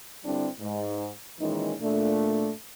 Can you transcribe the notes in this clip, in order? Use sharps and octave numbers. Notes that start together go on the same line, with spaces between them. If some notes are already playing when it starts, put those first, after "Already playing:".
G2 D3 G3 C4 D4 E4
G#2
A#2 D#3 E3 G#3 C#4 D#4
A#2 A3 D4